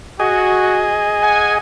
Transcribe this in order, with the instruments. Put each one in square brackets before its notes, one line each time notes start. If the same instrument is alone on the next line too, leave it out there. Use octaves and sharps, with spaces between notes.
[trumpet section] F#4 [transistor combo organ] G#4 D#5
[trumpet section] F#5 G#5